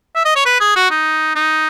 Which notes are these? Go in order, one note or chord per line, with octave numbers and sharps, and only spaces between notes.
E5
D#5
C#5
B4
G#4
F#4
D#4
D#4